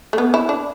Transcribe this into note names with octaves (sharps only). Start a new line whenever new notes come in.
A3
B3
E4
D4